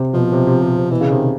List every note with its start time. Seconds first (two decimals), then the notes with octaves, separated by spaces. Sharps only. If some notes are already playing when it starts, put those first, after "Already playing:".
Already playing: C3
0.14 B2 F3
0.32 C3
0.47 C3
0.62 C3
0.76 C3
0.91 B2 E3
1.01 C#3
1.10 C3 D#3